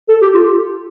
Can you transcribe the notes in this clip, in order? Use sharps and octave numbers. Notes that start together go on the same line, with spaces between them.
A4
G4
F4